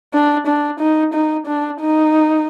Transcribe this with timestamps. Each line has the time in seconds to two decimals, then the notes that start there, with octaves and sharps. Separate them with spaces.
0.14 D4
0.47 D4
0.80 D#4
1.14 D#4
1.47 D4
1.81 D#4